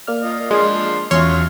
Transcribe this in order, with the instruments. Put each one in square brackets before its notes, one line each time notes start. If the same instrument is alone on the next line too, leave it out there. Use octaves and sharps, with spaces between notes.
[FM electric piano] A#3 D5 F6
[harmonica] F4 D#5
[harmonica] F3 D4 C6 [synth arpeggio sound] G#3
[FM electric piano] E2 C#4 E5 [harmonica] F#3 F4 F6 [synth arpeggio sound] C#5 C6